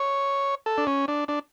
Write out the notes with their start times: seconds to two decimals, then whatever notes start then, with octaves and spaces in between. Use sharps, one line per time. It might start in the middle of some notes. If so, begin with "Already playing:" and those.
Already playing: C#5
0.66 A4
0.78 D4
0.87 C#4
1.08 D4
1.28 D4